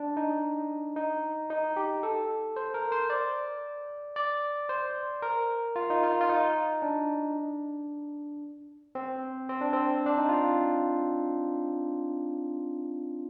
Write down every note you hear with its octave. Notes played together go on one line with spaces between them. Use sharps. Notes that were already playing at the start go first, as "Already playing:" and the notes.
Already playing: D4
D#4
D#4
D#4
G4
A4
C5
A#4
C5
D5
D5
C5
A#4
F4
D#4
F4
F4
D#4
D4
C4
C4
D4
C4
D4
D#4
F4